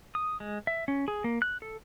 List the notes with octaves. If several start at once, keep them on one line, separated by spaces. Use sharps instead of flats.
D#6
G#3
E5
C#4
G#4
A#3
F#6
A4